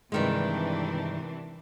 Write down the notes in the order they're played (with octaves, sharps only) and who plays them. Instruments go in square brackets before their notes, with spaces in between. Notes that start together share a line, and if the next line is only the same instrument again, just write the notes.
[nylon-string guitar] G2 D#3 G#3 [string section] C3 E3 D4